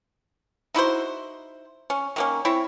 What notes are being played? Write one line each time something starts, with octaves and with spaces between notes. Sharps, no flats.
D#4 E4 F#4 C5
C#4
D#3 A#3 C#4
C4 E4 C#5